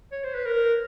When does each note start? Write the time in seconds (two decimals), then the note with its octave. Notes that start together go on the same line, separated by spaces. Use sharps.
0.12 C#5
0.24 C5
0.35 B4
0.46 A#4